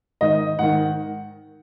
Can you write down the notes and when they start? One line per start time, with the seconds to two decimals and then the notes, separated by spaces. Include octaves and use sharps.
0.21 G#2 D#3 D#5
0.59 G#2 D#3 F#5